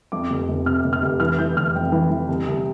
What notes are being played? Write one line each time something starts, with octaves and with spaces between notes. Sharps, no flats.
F2 D6
F1
F1
C3 F6
F1
F6
F1
E3 F6
E3 G6
F1 F6
F2 G5
E3
E3
C2
C2